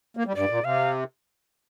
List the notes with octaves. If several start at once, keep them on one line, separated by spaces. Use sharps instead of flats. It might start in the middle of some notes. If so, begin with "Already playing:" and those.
A#3
G3
G2 D5
A#2
C3 F5